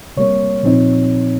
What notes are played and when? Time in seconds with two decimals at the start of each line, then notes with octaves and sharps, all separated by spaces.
0.17 C3 G3 A#3 C#5
0.63 A#2 F3 C4 D#4